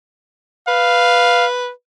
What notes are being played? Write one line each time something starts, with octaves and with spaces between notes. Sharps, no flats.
B4 F5